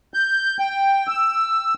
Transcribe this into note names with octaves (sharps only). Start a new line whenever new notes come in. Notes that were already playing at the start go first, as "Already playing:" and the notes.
G6
G5
E6